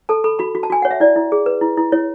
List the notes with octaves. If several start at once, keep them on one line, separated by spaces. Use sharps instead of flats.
A4 A5
A4 B5
F#4 B5
F#4
A5
F#4 G#5
C#5 F#5
E5
E4 D5
E4
G#4
B4
E4
E4
E4 C#5